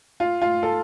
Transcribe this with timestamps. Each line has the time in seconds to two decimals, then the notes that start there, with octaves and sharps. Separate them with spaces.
0.20 F4
0.42 F4
0.63 A4